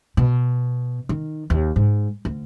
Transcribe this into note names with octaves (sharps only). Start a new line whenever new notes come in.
B2
D#3
D#2
G#2
D2